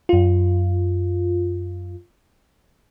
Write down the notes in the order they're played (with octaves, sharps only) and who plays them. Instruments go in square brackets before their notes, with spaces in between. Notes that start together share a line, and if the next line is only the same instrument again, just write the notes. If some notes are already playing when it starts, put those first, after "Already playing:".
[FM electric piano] F#2 F4